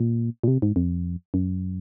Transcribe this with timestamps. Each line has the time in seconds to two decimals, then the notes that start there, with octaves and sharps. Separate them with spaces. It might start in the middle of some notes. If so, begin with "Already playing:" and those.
Already playing: A#2
0.43 A#2
0.48 C3
0.62 G#2
0.76 F2
1.34 F#2